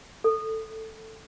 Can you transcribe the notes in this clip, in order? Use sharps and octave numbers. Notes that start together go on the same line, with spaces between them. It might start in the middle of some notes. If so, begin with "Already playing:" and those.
A4